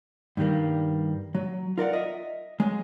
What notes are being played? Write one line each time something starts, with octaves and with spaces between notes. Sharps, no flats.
G2 D#3 G3 A#3
F#3
F4 A#4 D5 F#5
D#5 E5
F#3 G#3